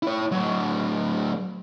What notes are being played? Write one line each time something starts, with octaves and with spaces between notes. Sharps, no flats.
E4 C#5
A2 F#3